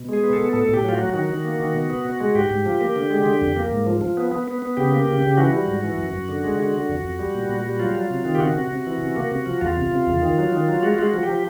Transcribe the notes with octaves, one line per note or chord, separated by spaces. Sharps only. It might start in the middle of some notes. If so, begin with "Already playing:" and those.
Already playing: B2
G#3 G#4
B3
A4
B2
A2 A4
A2 G4
F#3 F4
F#3 F#4
D#3 F#4
D#3
A#3
D#3
B2
B3
B2
G#3
G#2 G4
G#2
F3
A#3
D3
G#3
D3
F2
A#3
G#2
F3
F3
B3
B3
B3
B3
C#3 G4
A#3
C#3
C#3
E3 F#4
G3
G#2
E3
F#2
F#2
D3
G#3
D3 F#4
D3
F2
F2
G3
A#2
A#2
G3
F#3 F4
F#3
C3
D#3
G4
C3 F#4
C3
C3
E3
C3
A#3
C3
F3
E2 F4
C3
C3
E2
D#3
F#3
D#3
F#3
G#3 F#4
F4
G#3 F#4
F3
G4
F3